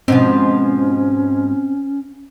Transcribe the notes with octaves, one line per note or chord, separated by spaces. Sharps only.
G#2 B2 F3 C4 C#4